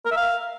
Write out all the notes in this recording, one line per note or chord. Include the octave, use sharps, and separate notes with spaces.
A#4
E5
F5